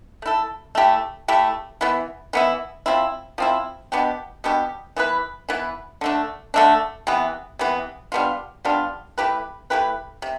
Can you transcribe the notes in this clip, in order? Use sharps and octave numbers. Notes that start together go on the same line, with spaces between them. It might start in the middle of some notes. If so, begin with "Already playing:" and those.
A3 E4 A4
A3 E4 G4
A3 E4 G4
E3 B3 E4
E3 B3 E4
F3 C4 E4
F3 C4 E4
B2 B3 D4 G4
B2 B3 D4 G4
E3 B3 E4 B4
E3 B3 E4 B4
D3 A3 D4
D3 A3 D4
C3 E3 B3
C3 E3 B3
G3 B3 D4 F4
G3 B3 D4 F4
A3 E4 G4 B4
A3 E4 G4 B4
C3